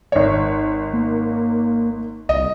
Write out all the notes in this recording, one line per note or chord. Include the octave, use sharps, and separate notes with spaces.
G#1 C#5
A#3
C2 D#5